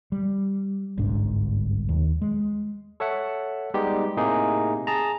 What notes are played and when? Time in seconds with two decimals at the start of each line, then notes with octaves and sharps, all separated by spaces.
0.12 G3
0.98 G1 C2 G#2 D4
1.89 D#2
2.22 G#3
3.00 A4 C#5 E5 F#5
3.74 G3 G#3 B3 D#4 G4
4.17 A2 C3 A#3 D#4 G#4
4.87 G#4 A5 A#5